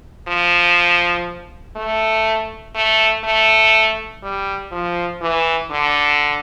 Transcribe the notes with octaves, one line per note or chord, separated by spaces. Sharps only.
F3
A3
A3
A3
G3
F3
E3
D3